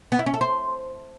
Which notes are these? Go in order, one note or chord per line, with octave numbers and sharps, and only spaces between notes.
B3
E4
C#4
A4
C5